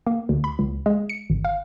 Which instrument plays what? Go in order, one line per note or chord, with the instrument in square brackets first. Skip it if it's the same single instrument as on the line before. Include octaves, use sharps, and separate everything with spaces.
[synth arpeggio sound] A#3
D2
B5
C#2
G#3
C#7
G#1
F5